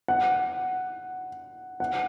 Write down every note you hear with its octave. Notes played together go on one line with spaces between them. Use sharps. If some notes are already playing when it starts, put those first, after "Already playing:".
F#5
F#5